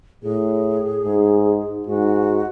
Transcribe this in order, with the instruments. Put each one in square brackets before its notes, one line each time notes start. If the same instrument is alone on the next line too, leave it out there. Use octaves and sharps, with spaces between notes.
[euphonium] A2 [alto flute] G#4
[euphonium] G#2
[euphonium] G#2 [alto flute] F#4